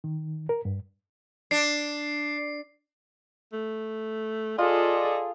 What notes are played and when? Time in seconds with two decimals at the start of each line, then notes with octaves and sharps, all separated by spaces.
0.04 D#3
0.49 A#4
0.65 G2
1.51 D4 C7
3.53 A3
4.58 F4 G#4 A4 D5 D#5